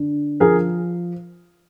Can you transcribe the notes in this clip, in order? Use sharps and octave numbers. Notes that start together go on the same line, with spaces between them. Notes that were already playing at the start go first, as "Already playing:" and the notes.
Already playing: D3
F3 G#4 A#4